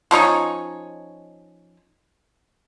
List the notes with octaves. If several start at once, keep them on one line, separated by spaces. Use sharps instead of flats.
F3 C#4 D#4 C#5